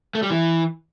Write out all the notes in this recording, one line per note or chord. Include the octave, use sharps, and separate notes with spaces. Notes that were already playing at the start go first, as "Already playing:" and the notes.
A3
G3
E3